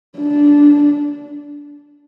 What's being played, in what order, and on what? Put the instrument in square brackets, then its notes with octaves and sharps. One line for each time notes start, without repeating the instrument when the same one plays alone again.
[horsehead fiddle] D4